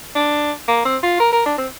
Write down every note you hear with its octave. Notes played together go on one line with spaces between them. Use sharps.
D4
A#3
C4
F4
A#4
A#4
D4
C4